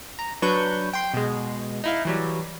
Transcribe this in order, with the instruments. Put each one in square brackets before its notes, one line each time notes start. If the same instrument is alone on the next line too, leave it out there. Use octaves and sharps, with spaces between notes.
[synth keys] A#5
F#3 D4 B4 C#6 G6
G5 C6
B2 G#3
D#4 E4 F5
E3 F#3 G3